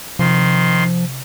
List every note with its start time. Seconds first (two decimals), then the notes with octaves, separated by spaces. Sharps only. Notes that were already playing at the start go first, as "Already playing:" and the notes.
0.19 C3 D#3 F3 C6